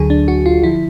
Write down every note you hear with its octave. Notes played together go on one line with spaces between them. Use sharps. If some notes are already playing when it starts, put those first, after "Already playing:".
Already playing: D2 D3 F#3 G#4
D4
F#4
F4
D3 F3 E4